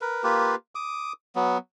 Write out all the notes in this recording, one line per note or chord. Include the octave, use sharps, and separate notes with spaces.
A#4 B4
A#3 F4 G4 B4
D6 D#6
F#3 B3